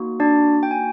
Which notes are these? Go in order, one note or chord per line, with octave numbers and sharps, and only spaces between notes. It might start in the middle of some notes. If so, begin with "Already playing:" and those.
Already playing: A#3 D#4 F#4
D4 D5
G5
G#5